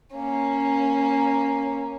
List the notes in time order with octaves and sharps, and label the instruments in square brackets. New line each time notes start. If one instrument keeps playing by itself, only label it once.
[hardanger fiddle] A#3 C#4